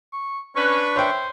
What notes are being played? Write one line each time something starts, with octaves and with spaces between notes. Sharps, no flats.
C#6
C#4 D4 B4 C#6
C5 C#5 E5 G5